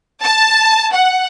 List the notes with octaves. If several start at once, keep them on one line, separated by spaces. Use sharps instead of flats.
A5
F#5